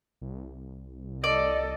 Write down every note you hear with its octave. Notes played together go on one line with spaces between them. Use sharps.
C2
A4 D5 D#5